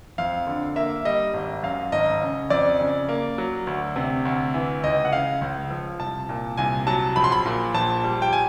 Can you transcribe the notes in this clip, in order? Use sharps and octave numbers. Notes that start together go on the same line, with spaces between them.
F2 F5
D3
A#3 E5
G3 D#5
G#1
F#2 F5
G#1 D#5
C#3
F2 D5
C#3
A#3
F#3
D2
C3
D2
E3
C#2 D#5
F#5
C#3 F5
C#2
F3
C2 A5
A#2
C2 G#5
F#3 A5
A#1 B5
C6
B5
A#2
A#1 A5
G3
G5
G#5